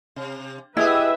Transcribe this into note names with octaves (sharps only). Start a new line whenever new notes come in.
C3
B3 E4 G4 G#4 B4 D#5 E5